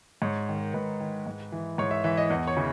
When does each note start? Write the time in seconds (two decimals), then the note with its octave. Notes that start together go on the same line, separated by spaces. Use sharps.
0.22 G#2 C#5
0.49 D#3
0.57 A#4
0.74 G#2 B4
1.00 D#3
1.26 G#2
1.52 E3
1.78 G#2 C#5
1.91 E5
2.04 E3 E5
2.17 D#5
2.30 E2 D#5
2.47 C#5
2.57 C#3 E3